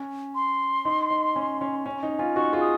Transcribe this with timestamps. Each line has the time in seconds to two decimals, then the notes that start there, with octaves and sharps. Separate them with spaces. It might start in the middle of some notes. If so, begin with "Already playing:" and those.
Already playing: C#4
0.35 C6
0.85 D#4
1.10 D#4
1.36 C#4
1.61 C#4
1.86 C#4
2.03 D#4
2.19 C#4 F4
2.36 D#4 F#4 C#6
2.53 F4 G#4
2.61 D#6